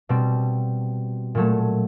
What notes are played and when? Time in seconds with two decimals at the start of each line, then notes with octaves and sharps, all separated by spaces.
0.09 B2 G3 C4
1.35 A#2 F#3 A3